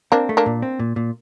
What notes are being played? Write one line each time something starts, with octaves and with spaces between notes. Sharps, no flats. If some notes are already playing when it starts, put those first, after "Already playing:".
A#3 C4 D4
A3
A#3 D4
A#2
C4
A#2
A#2